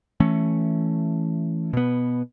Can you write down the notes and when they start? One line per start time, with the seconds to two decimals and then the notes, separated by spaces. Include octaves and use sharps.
0.20 E3 A3 C#4
1.73 B2 B3